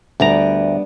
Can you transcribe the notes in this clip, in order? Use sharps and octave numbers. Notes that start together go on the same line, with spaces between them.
D2 G3 B3 D4 A#5